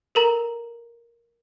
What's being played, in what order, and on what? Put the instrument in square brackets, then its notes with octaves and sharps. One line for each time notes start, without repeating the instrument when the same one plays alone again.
[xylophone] A4 A#4 A#5